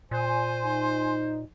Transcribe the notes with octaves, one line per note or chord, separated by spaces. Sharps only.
A#2 C5 G#5 C6
D#4